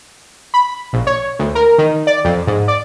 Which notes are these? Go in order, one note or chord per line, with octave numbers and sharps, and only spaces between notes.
B5
A#1
C#5
D2
A#4
D#3
D5
F2
G#2
D5